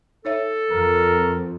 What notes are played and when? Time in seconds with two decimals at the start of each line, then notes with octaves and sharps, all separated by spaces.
0.25 D#4 A4 C#5 E5
0.71 F2 A#4